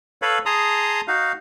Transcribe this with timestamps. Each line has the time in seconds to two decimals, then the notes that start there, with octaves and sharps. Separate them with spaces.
0.22 A4 B4 C#5 F5 B5
0.46 G#4 A5 A#5 C6 D#6
1.08 D#4 F#4 F5